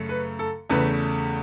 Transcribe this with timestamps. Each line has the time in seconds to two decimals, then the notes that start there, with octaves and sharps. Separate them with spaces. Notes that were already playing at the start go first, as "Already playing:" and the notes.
Already playing: F#2 C#3 A3
0.09 B4
0.39 A4
0.70 E2 C#3 A3 B4